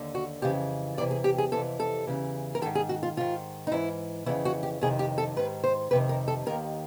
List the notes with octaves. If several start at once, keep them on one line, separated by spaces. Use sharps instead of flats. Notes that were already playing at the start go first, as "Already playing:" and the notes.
Already playing: D#2 D3
F#4
F2 C#3 E3 G4
E2 C3 E3 D5
G#4
G4
G#4
F2 C3 E3 A4
A4
E2 C#3 E3
A#4
G#2 D#3 A4
G#4
F#4
F4
G#2 D#3 F4
D#4
G#2 E3 E4
F2 C#3 E3 E4
F#4
G4
F2 C3 D#3 G#4
G4
A4
G#2 D#3 B4
C5
F2 C3 D#3 B4
A#4
A4
D#2 D#3 A#4